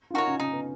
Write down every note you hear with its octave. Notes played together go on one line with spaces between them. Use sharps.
F4
D#4 F#4 A#4 C#5
C#4
C#4 D#4
B3